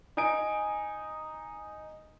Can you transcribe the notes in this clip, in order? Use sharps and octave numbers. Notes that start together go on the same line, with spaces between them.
D#4 G#5 D7